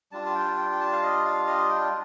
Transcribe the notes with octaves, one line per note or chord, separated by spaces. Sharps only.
G3 D4 F4 A5
A5
G5
G5
G5
A5
F5
D#5
F5
D#5
G5